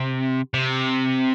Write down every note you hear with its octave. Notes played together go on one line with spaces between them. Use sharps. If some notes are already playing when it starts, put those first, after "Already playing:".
Already playing: C3
C3